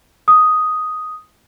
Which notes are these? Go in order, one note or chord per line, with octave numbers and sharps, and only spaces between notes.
D#6